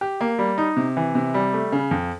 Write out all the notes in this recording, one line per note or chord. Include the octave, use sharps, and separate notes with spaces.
G4
A#3
G3
D#4
C3
E3
C3
G3
A3
C#3
F2